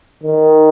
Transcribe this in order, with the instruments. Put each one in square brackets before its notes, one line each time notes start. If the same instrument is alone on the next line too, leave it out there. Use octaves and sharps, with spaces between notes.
[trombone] D#3